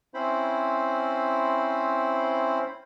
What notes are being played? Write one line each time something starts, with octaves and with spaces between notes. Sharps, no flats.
C4 C#4 E4 C5 B5